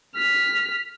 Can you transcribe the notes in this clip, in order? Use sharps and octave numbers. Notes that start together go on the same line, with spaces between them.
F6 B6